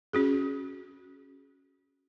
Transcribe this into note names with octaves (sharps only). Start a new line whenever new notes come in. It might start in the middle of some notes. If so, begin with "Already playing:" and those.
C#4 F#4 G#4